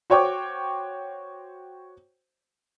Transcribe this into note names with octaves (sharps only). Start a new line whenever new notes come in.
F#4 C5 C#5 G5 C#6 D6